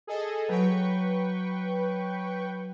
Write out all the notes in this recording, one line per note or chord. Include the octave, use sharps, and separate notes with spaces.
G#4 A4 D#5
F#3 B4 G5 C#6